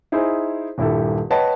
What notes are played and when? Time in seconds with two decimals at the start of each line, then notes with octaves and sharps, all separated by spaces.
0.12 D#4 E4 G#4 C5
0.78 D#1 G2 E4 G4 A4
1.30 B4 C#5 D#5 F#5 G5 A5